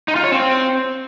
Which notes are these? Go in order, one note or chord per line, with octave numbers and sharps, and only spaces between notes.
D#4
F4
C#5
C4